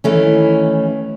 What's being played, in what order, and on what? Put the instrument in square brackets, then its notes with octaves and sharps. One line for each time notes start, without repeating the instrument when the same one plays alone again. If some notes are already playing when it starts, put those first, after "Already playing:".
[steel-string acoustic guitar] D#3 E3 A3 C#4